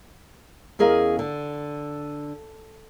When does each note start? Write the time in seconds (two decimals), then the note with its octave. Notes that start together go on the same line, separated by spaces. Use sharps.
0.79 E2 C#4 G#4 A#4 D#5 F5
1.19 D3